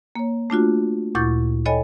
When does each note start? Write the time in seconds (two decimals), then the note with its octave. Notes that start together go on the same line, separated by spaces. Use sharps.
0.15 A#3 C#5
0.50 A3 D4 F4 F#4
1.15 D2 A#2 E4 C#6 G6 A6
1.66 A4 C#5 D#5 G5 G#5 B5